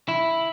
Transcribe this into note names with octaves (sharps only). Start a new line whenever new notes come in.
E4